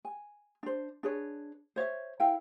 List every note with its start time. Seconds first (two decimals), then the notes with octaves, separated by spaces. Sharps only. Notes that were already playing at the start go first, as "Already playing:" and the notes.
0.05 G#5
0.63 D4 C5
1.03 D4 G#4 B4 C#5
1.76 C5 C#5 D#5 E5
2.20 E4 A#4 F5 G5